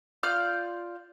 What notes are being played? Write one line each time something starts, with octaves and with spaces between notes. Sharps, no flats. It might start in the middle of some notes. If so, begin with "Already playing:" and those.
F4 D5 F6 G6